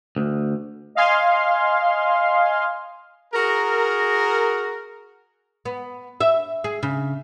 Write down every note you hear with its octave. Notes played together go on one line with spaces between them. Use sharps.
D2
D#5 F5 G#5 C6
F#4 G#4 A#4
B3
E5
G#4
C#3